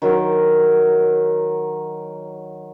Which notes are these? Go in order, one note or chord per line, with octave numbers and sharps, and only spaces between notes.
D#3 F#3